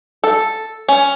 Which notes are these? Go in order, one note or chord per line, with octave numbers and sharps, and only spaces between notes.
A4
C#4